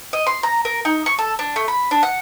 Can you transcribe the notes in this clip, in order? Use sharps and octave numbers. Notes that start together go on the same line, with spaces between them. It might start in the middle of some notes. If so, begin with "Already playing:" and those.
D#5
C6
A#5
A#4
D#4
C#6
A4
D4
A3
B5
D4
F#5